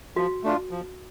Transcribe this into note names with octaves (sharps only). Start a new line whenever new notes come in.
F3 F#4
A3 D4 F4
F3